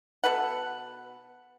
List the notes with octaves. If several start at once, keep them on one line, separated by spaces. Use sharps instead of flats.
B2 A4 B4 F#5